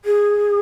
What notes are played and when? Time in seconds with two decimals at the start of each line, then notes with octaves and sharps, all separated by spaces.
0.05 G#4